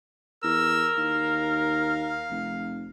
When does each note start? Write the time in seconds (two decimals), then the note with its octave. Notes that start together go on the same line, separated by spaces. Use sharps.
0.44 E2 A#4 E6
0.98 D#2 F5
2.31 F1